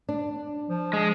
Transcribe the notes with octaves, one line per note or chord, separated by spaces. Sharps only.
D4
F3
G#3